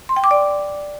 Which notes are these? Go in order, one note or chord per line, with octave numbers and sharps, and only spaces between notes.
C6
G5
D6
D5